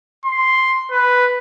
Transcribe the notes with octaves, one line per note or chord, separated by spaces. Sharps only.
C6
B4